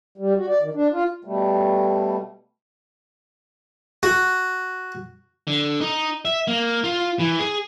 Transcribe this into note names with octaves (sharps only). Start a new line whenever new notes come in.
G3
F#4
D5
D#3
D4
F4
B2 G3 A3
F#4
D3
D#4
E5
A#3
F4
E3
G#4